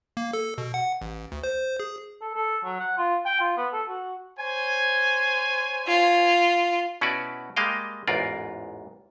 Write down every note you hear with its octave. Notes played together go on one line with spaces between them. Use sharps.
A#3
A4
B2
F#5
A1
D2
C5
G#4
A4
A4
F#3
F#5
F4
G5
F4
B3
A4
F#4
C5 C#5 G#5
F4
B2 C#4 E4 F#4 B4 D5
G3 G#3 A#3 D#5 F5 G5
A1 E2 G#2 F4 A#4 D5